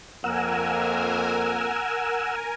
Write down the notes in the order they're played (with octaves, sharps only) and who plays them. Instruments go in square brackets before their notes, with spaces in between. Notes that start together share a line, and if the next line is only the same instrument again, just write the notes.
[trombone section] F2 A#3 [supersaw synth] A#4 G#5 [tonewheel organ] F#5 E6